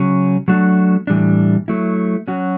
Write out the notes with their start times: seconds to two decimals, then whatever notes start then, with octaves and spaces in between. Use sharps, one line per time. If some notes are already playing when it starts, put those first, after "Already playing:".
Already playing: C#3 F#3 C#4
0.48 F#3 A3 D4 F#4
1.07 A2 E3 G3 D4
1.68 F#3 A3 E4
2.28 F#3 C#4 F#4